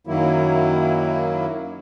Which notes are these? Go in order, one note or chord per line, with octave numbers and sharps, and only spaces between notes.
F#2 D#3 F#3 A#3 E4